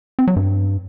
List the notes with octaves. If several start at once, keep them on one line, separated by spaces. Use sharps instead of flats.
C4
F#3
G2